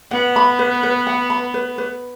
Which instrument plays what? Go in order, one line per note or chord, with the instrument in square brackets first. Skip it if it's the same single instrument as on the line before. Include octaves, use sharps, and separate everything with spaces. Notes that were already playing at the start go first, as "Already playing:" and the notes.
[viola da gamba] B3 [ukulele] F#5
[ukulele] B5
B4
B4
F#5
B5
B4
B4